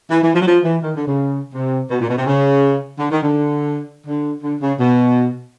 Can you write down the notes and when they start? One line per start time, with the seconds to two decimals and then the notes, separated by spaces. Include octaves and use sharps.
0.11 E3
0.22 E3
0.34 F3
0.41 F#3
0.47 F3
0.64 E3
0.82 D#3
0.95 D3
1.07 C#3
1.54 C3
1.90 B2
2.00 A#2
2.09 B2
2.17 C3
2.26 C#3
2.98 D3
3.11 D#3
3.22 D3
4.06 D3
4.42 D3
4.61 C#3
4.79 B2